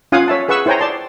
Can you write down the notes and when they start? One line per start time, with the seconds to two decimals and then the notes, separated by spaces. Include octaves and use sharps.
0.12 C#4 F4 F5 F#5 G#5 D#6
0.28 C#5 E5 A5
0.48 G#4 B4 F#5 C#6 E6
0.66 E4 C5 C#5 G5 G#5 A#5
0.80 D5 A5 C6